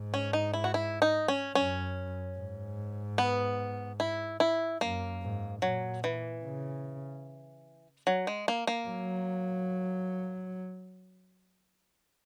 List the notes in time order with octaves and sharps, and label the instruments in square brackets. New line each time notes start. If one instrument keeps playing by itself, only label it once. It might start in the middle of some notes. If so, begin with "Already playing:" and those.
Already playing: [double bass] G#2
[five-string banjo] C#4
D#4
E4
F#4
E4
D#4
C#4
[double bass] F#2 [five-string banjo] C#4
[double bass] G#2
[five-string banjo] B3
E4
E4
[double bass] F#2 [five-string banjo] A#3
[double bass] G#2
[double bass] A#2 [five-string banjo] F#3
[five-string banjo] E3
[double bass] C#3
[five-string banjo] F#3
G#3
A#3
A#3
[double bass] F#3